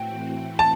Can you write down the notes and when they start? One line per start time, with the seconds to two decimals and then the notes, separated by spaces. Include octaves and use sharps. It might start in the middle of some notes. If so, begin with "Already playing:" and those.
Already playing: A2 E3 A3 C4 F#4 G5
0.59 A5